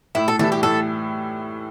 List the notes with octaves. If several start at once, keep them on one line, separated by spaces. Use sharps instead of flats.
A2 E4
A4
E3 G3 E4 A4
G4
A2 A4